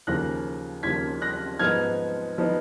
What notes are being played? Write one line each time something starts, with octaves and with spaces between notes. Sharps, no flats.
D#2 C#3 F3 A#3 F#6 A#6
D#2 C#3 F3 A#3 G#6 B6
F#6 A#6
G#2 F3 B3 D#4 F6 G#6
F3 B3 D#4